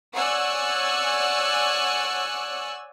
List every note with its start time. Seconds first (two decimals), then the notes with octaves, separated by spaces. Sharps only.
0.15 C#5 D5 F#5 G#5 E6 F#6